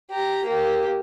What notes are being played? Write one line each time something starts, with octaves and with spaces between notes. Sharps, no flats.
G4 A#5
A#3 G4